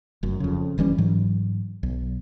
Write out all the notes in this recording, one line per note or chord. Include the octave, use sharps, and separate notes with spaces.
F1 F#2
F2 C#3
F#1 E3 G3 C#4
G#2 E3 F#3
B1